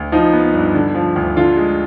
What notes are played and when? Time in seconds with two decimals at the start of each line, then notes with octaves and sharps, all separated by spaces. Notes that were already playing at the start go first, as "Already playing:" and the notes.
Already playing: D2
0.12 F3 D#4
0.33 B3
0.54 G2
0.75 D3
0.94 F3
1.16 D2
1.36 D3 F4
1.57 G#3